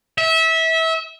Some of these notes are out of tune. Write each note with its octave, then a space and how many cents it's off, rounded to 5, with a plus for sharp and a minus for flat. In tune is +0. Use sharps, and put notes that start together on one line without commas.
E5 -25